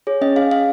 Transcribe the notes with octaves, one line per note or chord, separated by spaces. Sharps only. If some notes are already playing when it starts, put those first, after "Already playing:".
G#4 C#5
C#4 D#5
G#4 F5
C#4 F5